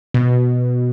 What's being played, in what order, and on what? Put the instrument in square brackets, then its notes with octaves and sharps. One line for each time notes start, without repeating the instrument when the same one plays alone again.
[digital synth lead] B2